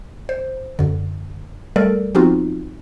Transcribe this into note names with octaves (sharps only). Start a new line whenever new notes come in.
C5
F#2 D3
G3 A3 A4 A#4 D5
F3 B3 C4 D#4 F4 F#4